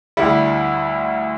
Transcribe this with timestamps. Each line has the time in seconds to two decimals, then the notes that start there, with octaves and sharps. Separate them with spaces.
0.17 D2 D3 G3 E4